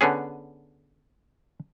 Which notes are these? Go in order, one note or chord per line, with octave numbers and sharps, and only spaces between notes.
D3 B3 C#4 G#4